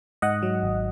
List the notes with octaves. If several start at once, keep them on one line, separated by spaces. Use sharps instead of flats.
G#2 D#5 F#5
F#3
G#1